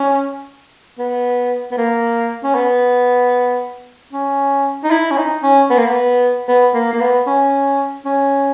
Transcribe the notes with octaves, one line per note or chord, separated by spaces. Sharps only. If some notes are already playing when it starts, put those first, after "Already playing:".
Already playing: C#4
B3
B3
A#3
C#4
B3
C#4
D#4
E4
C#4
D#4
C#4
B3
A#3
B3
B3
A#3
A#3
B3
C#4
C#4